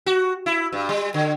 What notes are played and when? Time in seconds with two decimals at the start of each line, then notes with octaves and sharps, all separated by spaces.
0.06 F#4
0.46 E4
0.72 G2
0.89 G3
1.14 D3